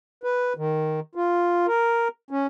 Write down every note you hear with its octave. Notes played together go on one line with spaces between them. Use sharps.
B4
D#3
F4
A#4
C#4